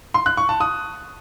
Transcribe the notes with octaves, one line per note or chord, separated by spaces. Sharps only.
C6
F#6
C#6
A5
D#6